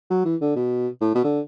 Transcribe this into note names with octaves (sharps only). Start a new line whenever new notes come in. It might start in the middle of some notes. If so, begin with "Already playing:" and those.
F#3
E3
D3
B2
A2
B2
D3